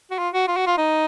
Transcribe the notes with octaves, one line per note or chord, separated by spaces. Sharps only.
F#4
F4
F#4
F4
F#4
F4
D#4